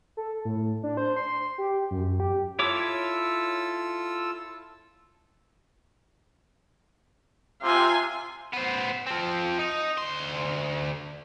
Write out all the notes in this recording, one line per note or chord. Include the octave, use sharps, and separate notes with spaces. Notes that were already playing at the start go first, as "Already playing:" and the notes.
A4
A2
D4
C5
C6
G4
F#2
G4
E4 F4 A4 C#5 D6 E6
C3 F4 G#5
B3 C5
F3 C4
D#4
D2 C6